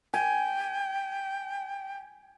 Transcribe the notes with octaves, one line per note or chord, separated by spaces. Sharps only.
G5 G#5